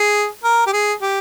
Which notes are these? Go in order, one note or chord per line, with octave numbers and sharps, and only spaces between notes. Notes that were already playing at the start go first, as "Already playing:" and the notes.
Already playing: G#4
A#4
G4
G#4
G4